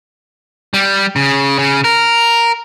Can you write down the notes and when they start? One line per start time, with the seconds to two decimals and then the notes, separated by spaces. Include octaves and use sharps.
0.74 G3
1.16 C#3
1.59 C#3
1.84 A#4